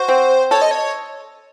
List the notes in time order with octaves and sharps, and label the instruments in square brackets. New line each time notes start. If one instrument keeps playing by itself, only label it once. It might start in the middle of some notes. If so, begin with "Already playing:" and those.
Already playing: [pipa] F#4 [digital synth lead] C5
[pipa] C4
[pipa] A4 [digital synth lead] C#5
[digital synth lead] D#5
C#5